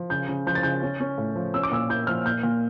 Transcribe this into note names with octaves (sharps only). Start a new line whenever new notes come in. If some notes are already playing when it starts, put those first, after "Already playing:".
Already playing: F3
C#3 G6
C#3
F3 G6
A6
C#3 G6
C#4
C#4
A2
F3
C#4 E6
D6
A#2 E6
E4 G6
F3 F6
A#2 G6
A#2